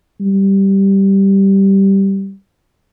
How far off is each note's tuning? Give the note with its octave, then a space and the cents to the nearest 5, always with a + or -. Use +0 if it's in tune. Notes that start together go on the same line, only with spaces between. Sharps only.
G3 -5